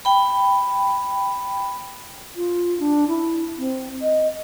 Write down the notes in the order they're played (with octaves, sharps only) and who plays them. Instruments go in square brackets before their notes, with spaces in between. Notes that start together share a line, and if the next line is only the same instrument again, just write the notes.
[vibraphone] G5 B5
[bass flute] F4
D4
E4
C4
D#5